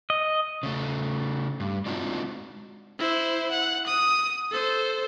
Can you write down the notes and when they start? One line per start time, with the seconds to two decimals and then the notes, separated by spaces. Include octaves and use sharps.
0.10 D#5
0.63 C#3 A3
1.60 G2
1.86 G#3 C4 D4 D#4 F4 F#4
2.99 E4 C5
3.51 F#5
3.87 D#6
4.52 A4 C5